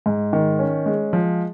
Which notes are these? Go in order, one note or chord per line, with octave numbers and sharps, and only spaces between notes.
G#2
D#3
C#4
G#3
F3